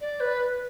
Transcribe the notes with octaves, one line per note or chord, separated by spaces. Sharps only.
D5
B4